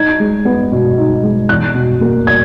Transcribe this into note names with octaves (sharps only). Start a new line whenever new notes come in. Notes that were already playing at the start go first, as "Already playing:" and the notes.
Already playing: D#4 G#6
G#3
B3
B2
D#4
G#3
E2 F#6
B2
A#3
G#6